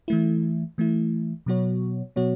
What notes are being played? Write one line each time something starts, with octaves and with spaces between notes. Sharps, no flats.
E3 A3 E4
E3 A3 E4
B2 F#3 B3 F#4 C#5
B2 F#3 B3 F#4 C#5